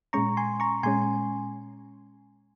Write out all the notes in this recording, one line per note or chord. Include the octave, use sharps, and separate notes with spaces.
A#2 G#3 C#4 A#5 C#6
G#5 C6
A#5 C#6
A#2 G#3 C#4 G#5 C6